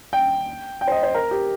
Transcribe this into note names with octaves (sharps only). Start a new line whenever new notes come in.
G5
G5
C5
D#5
C5
A#4
G4